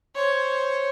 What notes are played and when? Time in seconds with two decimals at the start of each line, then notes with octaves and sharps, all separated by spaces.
0.15 C5 C#5